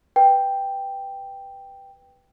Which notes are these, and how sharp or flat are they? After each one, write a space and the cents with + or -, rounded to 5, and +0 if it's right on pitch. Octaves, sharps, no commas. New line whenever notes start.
B4 +0 G5 +0